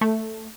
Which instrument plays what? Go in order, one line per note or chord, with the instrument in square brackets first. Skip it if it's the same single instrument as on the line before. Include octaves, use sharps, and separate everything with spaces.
[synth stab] A3